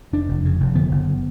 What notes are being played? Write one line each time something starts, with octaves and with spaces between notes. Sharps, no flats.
F1 D4
F1
C#3
F1
D3 B3
F#1